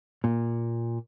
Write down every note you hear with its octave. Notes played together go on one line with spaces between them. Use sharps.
A#2